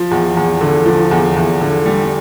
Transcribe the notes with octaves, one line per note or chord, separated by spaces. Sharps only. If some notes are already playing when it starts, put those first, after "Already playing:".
Already playing: F3
E2
E2
D3
F3
E2
E2
D3
G3